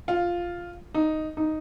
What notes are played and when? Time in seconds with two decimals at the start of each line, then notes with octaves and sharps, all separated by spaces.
0.08 F4
0.95 D#4
1.37 D#4